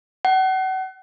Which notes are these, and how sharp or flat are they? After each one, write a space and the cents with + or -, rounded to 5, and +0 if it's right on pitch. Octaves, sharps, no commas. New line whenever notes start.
F#5 +35